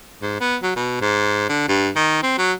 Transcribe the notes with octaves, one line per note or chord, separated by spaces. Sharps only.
G#2
B3
F#3
B2
G#2
D3
G2
D#3
C4
F#3